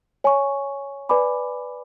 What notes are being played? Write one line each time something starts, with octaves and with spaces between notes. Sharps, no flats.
C#5 G#5 C#6
B4 D5 G#5 B5 D6